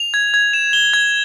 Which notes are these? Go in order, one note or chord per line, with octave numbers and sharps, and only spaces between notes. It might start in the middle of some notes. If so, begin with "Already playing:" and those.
Already playing: F7
G#6
G#6
E7
G7
G#6